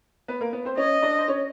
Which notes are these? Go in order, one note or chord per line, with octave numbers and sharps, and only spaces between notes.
B3 B4
A#3 A#4
B3 B4
C4 C5
C#4 C#5 D#5
D4 D5
C5
C#4 C#5